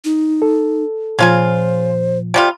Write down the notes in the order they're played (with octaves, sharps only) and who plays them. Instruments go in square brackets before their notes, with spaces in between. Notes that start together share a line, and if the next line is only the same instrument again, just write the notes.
[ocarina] D#4
[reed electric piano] A4
[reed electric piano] A#2 F3 [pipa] C#3 F4 G#5 [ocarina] C5
[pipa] C3 G3 F4